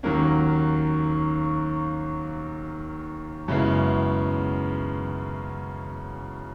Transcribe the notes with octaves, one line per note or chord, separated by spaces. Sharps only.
D#2 D#3 F#3 A#3 C#4
F#2 C#3 G#3 B3 E4